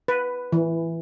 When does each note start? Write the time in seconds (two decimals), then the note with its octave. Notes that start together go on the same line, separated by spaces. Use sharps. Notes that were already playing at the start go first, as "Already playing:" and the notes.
0.08 B4
0.52 E3